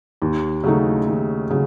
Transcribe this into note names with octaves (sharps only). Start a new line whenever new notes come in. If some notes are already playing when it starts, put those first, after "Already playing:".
D#2
C#3 F#3 A3 D#4
D#2
C#3 F#3